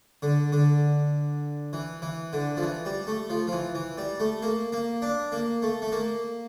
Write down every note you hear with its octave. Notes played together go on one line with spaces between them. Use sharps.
D3
D3
E3
E3
D3
F3
E3
G3
A3
F3
F3
E3
E3
G3
A3
A#3
A#3
D4
A#3
A3
A3
A#3